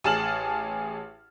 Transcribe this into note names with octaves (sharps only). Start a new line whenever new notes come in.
A1 G#4 A5 F6 E7 F#7